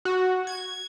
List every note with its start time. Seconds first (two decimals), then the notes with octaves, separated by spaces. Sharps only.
0.05 F#4
0.47 G#6